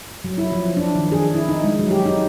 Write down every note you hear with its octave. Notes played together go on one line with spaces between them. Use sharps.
F#3
E4
F3
D4
D#3
G#4
E4
D#4
G#3
F#3
G4
D#4